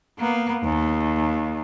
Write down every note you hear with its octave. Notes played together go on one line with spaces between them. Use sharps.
A#3 B3
D#2